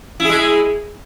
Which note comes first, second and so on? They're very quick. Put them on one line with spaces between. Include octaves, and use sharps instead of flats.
E4 G#4 G#3